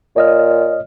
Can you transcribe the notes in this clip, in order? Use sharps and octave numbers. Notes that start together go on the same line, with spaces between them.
A#2 C#5 D#5 F6